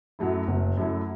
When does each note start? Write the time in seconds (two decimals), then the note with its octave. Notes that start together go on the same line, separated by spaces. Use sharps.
0.19 F#2 F#3 A3 E4
0.48 F#1
0.77 F#2 F#3 A3 E4